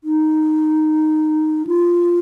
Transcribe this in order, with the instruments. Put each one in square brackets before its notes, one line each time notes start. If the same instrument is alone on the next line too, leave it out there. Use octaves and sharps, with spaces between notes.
[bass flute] D#4
F4